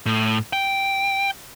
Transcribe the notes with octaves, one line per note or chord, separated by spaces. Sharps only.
A2
G5